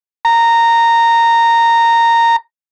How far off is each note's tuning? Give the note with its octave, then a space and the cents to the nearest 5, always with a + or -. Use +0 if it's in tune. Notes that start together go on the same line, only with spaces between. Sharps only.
A#5 -15